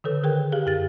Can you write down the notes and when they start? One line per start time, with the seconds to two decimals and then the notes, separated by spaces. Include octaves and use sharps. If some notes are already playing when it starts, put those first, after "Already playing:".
0.04 D3 D#3 A4 B4
0.24 G#4 A#4 G5
0.52 G4 G#4 F5
0.66 F#2 G4 A6